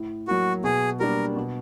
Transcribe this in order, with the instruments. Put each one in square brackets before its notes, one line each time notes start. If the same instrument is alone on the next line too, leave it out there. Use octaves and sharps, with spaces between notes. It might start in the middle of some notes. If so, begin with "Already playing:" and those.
Already playing: [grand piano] A2
[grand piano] F#3 A#3 [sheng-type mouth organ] F#4
[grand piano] B2 [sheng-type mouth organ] G#4
[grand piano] G3 A#3 D4 [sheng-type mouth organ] A#4
[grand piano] B2